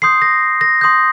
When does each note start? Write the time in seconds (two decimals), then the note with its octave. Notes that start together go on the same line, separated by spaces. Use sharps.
0.02 C6 D#6 G6 C7
0.22 A#6
0.61 A#6
0.81 C6 D#6 G6